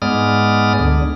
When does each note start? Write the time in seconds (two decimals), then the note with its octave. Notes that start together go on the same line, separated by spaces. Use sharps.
0.02 G#2 G#3 B3 D5 D#6 F6
0.79 D2 D3